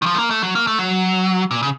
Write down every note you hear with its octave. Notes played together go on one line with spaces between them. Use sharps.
D#3
F3
A3
A#3
A3
F#3
A#3
A3
F#3
A#2
C#3